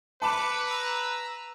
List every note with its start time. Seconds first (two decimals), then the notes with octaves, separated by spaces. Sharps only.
0.22 B4 A5 B5 D6 C#7 E7
0.67 A#5 E6